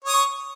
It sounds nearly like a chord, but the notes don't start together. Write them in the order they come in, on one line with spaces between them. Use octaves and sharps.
C#5 D#6 C#6